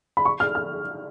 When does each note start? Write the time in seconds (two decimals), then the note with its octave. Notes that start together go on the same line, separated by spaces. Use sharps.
0.17 B5
0.25 C#6
0.40 F6
0.55 F6